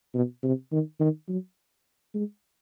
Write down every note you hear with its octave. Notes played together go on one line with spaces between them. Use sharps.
B2
C3
D#3
D#3
F#3
G#3